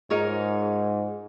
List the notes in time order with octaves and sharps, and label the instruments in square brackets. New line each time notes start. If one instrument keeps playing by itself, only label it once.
[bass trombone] G#2 [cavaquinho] D#4 A#4 C#5 [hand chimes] F4 G#4 D#5